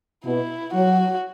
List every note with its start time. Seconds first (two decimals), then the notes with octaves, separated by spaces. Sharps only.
0.25 B2 E4
0.73 F#3 F#4